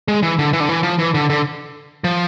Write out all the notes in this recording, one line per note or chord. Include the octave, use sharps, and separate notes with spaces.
G#3
E3
D3
E3
D3
E3
F3
E3
D3
D3
F3